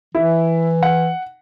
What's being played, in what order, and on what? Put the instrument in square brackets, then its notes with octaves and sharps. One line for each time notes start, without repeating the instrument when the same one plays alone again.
[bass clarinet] E3 [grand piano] E4
[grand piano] F#5